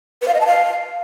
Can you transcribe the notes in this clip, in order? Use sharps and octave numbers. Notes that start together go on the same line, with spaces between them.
B4
F5
D#5
A5
F5